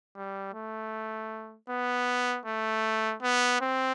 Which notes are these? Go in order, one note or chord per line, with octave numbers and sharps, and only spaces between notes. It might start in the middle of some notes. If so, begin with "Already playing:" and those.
G3
A3
B3
A3
B3
C4